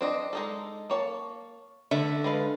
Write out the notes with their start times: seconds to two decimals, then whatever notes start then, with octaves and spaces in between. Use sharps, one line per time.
0.01 C4 D4 D#5
0.33 G#3 D#4 A4
0.90 A#3 C#5 A5
1.91 D3 A3 E5
2.24 G#3 B4 F5